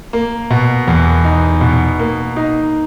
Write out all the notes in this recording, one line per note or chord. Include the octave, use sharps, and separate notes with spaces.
A#3
B2
E2
D#4
B2
A#3
D#4